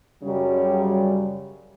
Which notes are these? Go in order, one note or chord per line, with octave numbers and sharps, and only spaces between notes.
F#2 C#3 F#3 G3